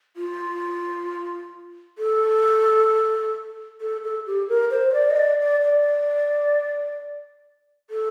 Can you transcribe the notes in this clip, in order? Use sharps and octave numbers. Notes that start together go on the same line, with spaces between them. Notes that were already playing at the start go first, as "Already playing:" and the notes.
F4
A4
A4
A4
G4
A#4
C5
C5
D5
D#5
D5
D5
D5
A4